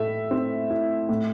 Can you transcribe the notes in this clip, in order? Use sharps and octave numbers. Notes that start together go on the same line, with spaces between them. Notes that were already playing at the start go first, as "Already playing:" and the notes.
Already playing: A2 A3 E5
C4
E4
A2